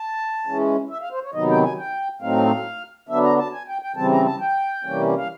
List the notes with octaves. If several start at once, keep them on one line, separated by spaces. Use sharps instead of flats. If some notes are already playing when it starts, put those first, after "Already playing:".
Already playing: A5
E3 G#3 C#4
E5
F5
C5
C#5
C3 D#3 F#3 B3 D#4 D#5
G5
G#5
G5
A2 F#3 A3 C4 D#4 F5
D3 F#3 B3 D4 E5
A#5
A5
G#5
G5
G5
C#3 E3 G3 C4 A5
A#5
A5
G5
C3 E3 G3 A#3 C#4
F5